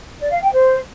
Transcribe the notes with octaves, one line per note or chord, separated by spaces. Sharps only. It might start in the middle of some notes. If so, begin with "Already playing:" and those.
D5
F5
G5
C5